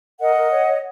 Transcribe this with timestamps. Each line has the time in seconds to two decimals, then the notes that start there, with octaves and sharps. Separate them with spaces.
0.18 A#4 D#5 F#5
0.35 A#4
0.51 C#5
0.66 C#5